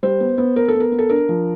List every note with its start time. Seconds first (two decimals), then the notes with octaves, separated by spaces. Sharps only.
0.03 G3 C5
0.20 B3
0.38 B3
0.56 B3 A#4
0.68 A4
0.75 B3
0.80 A#4
0.92 B3
0.99 A4
1.09 D4 A#4
1.29 F3